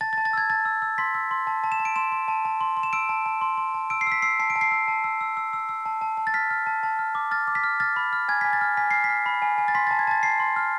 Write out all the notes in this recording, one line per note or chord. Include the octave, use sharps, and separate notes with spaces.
A5 A6
A6
A5
A6
E6 G#6
A5 A6
E6
E6
C6 B6
E6
C6
A5
A5
E7
A5
D7
C6 E7
C6
A5
A5
C6
C6
E7
E6 D7
A5
A5
C6
C6
A5
E6 D7
C7
E6 B6
E6 C7
A5 C7
D7
A5
C7
E6
A5
E6
E6
E6
E6
E6
A5
A5
A5
A6
F6 B6
F6
A5
A5
F6
D6
F6 A6
D6
B6
F6
F6 A6
B5
F6
G#5 G#6
G#5 B6
A6
F6
G#5 B6
F6 C7
B6
F6
B5
G#5
G#5
A6
C6 B6
A5 A6
G#6
A5 A6
A5 C7
C6
F6